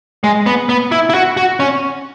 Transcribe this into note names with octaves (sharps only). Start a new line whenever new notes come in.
G#3
B3
B3
E4
E4
F#4
F#4
C#4